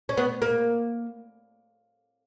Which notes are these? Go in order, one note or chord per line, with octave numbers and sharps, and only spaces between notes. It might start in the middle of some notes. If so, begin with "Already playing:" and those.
C#4
B3
A#3